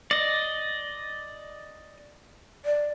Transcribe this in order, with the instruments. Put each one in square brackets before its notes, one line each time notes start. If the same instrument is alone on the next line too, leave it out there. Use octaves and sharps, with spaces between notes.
[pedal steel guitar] D5 D#5
[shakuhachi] D5